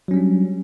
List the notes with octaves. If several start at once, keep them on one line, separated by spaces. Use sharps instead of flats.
F#3 G3 C#4 D4